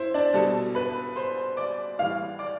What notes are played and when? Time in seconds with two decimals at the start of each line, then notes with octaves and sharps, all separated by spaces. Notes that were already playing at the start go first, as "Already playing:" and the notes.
Already playing: E4 C5
0.14 D4 D5
0.34 B2 G3 A4 A5
0.75 B4 B5
1.16 C5 C6
1.57 D5 D6
1.99 A2 E3 G3 F5 F6
2.39 D5 D6